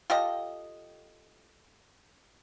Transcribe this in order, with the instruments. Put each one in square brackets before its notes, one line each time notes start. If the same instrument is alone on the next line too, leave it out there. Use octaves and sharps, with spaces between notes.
[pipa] F4 G4 A4 D#5